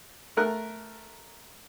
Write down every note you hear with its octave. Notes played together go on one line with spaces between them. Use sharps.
A3 A#4 F#6